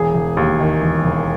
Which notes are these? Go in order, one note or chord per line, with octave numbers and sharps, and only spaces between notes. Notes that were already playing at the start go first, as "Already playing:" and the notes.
Already playing: E1 G#4
E1
D#2
D#3
E1
E1